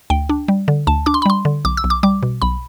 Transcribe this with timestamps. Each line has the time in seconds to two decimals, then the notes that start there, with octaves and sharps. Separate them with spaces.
0.10 D2 G5
0.29 D4
0.48 G3
0.68 D3
0.87 D2 A5
1.06 D4 D6
1.14 C6
1.22 B5
1.26 G3 C6
1.45 D3
1.65 B1 D6
1.77 E6
1.84 B1
1.90 D6
2.03 G3 D6
2.23 B2
2.42 B1 B5